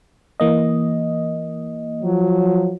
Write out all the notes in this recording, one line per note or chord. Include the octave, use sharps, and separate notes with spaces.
E3 A#3 D#5
F3 F#3